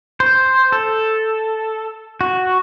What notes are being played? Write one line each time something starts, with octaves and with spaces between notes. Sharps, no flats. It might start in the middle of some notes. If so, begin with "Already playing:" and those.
C5
A4
F#4